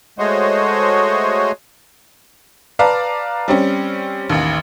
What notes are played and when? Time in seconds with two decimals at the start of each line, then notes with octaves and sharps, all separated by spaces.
0.19 G#3 A3 F#4 C5 C#5 D#5
2.79 B4 D5 F5 A5 A#5 D6
3.48 G3 C4 C#4
4.30 A1 D#2